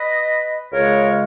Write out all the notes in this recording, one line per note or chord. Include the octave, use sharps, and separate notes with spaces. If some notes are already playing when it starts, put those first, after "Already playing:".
Already playing: B4 D#5
C#2 C#3 G#3 A#4 C#5